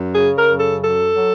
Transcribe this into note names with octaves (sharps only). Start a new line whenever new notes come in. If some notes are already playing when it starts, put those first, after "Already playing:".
Already playing: F#2
C#3 G#4
A#4
F#2
A4
F#3 A4
F#3